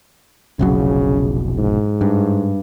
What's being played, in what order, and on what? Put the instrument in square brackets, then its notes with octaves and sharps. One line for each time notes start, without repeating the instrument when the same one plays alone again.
[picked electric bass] F1 B1 F#3 [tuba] C#3
[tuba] G#2
[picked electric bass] G2